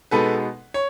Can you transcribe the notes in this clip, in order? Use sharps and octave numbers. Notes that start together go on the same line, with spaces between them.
B2 G#3 B3 D#4 A4 B4
C#5